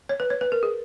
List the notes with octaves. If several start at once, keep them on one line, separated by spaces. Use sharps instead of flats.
C#5
B4
C#5
B4
A#4
G#4